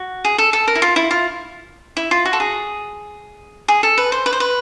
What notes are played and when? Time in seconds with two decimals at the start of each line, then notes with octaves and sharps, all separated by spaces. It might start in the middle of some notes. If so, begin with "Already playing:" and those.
Already playing: F#4
0.25 G#4
0.38 A4
0.53 A4
0.68 A#4
0.75 E4
0.82 F4
0.96 E4
1.11 F4
1.97 E4
2.11 F4
2.25 F#4
2.33 A4
2.40 G#4
3.68 G#4
3.83 A4
3.98 B4
4.12 C5
4.26 B4
4.33 C5
4.40 B4